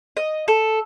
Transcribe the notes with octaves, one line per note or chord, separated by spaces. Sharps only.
D#5
A4